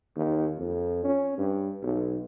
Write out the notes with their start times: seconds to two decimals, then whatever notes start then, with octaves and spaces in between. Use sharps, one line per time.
0.16 D#2
0.58 F2
1.04 C#4
1.38 G2
1.83 B1